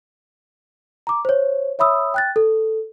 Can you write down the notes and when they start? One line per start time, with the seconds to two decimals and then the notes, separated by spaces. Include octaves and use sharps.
1.07 A#5 D6
1.25 C5 C#5
1.79 C#5 E5 B5 D#6 E6
2.14 G5 F#6 A6
2.36 A4